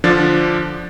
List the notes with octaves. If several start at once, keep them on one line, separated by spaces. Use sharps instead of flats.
D3 F3 D4 A6